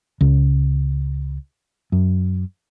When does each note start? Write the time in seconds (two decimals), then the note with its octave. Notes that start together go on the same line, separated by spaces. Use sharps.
0.21 C#2
1.92 F#2